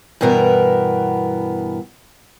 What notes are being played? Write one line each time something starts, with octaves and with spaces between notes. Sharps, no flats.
G2 B2 E3 B3 A#4